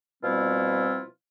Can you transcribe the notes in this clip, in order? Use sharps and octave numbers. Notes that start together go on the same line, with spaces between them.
B2 F3 G3 C4 E4 F4